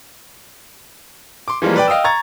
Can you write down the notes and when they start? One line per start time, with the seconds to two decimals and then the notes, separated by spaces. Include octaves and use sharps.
1.48 C6 D6
1.62 E3 F3 G3 G#3 A#3
1.76 B4 D5 G5
1.88 D#5 F5 G5 D#6 E6
2.04 A#5 C#6 G#6 A6